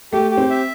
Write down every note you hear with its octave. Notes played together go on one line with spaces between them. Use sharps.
A3 G4
G4
C4
E5